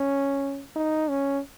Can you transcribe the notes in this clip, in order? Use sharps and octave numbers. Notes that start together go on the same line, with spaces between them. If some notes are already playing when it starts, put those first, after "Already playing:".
Already playing: C#4
D#4
C#4